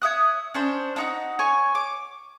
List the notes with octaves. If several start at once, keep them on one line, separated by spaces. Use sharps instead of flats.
C#5 E5 D#6 F#6
C#4 D4 C5
D4 D#4 F#4
C#5 G#5 C#6
D6